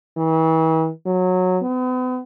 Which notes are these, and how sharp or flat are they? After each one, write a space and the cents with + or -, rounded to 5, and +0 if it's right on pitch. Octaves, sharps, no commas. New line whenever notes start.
E3 -40
F#3 -15
B3 +45